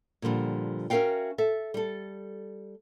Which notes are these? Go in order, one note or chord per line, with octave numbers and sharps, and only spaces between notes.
A#2 D3 F3 G3
C#4 F#4 A#4 E5 F5 G5
A4 E5
G3 A4